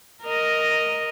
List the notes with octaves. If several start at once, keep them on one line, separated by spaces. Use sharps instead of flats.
A#4 D#5